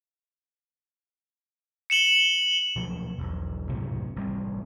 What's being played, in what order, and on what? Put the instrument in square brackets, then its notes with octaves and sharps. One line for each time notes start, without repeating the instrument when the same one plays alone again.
[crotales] C#7 E7 F#7 G7
[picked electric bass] B2 F3 F#3
E1 B1
C#2 F#2 A2 C3
A1 G3 A#3 C4